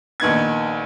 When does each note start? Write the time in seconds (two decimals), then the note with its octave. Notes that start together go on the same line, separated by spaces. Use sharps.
0.20 A#1 D#3 B3 G#6